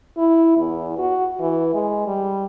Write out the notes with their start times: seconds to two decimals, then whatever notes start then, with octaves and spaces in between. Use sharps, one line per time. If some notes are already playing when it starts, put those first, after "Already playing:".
0.17 E4
0.57 E2
0.98 F#4
1.40 E3
1.74 G#3
2.06 G3